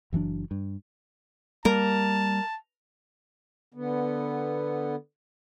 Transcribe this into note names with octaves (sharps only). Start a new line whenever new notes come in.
F#1 E3 F#3 D4
G2
G3 A#3 A#4 A5
D3 B3